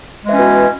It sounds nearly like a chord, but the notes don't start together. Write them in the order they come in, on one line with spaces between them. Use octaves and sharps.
G#3 E3 C#4 B2